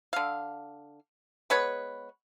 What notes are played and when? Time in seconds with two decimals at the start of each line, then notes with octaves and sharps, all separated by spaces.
0.13 D3 F5
1.50 G#3 B3 B4 C#5